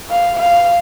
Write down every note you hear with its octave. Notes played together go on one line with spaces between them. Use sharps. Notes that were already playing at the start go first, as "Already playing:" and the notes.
F5
F5